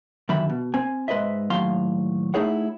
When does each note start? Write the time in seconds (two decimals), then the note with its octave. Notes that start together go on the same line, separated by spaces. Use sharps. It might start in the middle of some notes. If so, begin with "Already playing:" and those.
0.29 F#2 D3 D#3 E5 B5
0.50 B2
0.74 C4 G#5
1.08 G#2 B4 C5 D#5 E5
1.50 D#2 A2 F#3 F5 C6
2.34 A3 D#4 E4 G#4 C#5 F#5